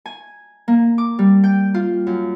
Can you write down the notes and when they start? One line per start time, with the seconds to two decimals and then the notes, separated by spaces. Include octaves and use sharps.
0.06 G#5
0.68 A#3
0.98 D6
1.19 G3
1.44 G5
1.74 F4
2.07 F#2